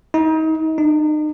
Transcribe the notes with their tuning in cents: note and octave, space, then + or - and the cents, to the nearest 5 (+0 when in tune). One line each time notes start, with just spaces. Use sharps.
D#4 +35
D#4 -35